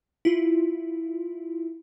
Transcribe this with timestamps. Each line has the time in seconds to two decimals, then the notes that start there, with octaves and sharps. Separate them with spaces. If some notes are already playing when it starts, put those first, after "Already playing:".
0.25 E4 F4